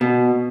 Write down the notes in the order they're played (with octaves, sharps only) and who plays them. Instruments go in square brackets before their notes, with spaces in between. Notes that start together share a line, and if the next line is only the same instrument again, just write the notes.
[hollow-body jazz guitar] B2